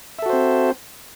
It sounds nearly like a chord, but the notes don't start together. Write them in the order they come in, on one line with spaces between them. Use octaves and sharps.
E5 A4 F#4 C5 C4